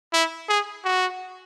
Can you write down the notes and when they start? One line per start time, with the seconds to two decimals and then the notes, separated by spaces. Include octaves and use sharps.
0.13 E4
0.49 G#4
0.85 F#4